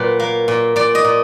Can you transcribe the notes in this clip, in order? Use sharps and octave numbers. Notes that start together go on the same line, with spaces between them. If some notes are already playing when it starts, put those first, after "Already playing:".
Already playing: A#2 F#3 B4
A#3
A#2
A#2 D5
D#5
A#2